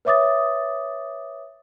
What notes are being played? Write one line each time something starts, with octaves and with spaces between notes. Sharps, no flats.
B4 C#5 E5 D6 D#6 A6